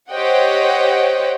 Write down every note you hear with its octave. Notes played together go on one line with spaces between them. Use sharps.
G4 C5 C#5 D#5 F#5 G5